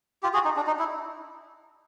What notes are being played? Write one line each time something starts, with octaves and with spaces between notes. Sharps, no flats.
F4 G4
F#4 G#4
D#4
D4
D#4
E4